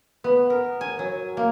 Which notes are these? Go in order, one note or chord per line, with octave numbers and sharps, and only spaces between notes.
B3
A#4
G#5
F#3
A#3